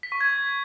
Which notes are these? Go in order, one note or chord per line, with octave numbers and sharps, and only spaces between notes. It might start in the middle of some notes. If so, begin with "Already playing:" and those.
B6
C#6
G#6